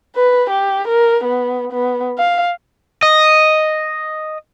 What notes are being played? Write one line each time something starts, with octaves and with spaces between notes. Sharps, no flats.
B4
G4
A#4
B3
B3
F5
D#5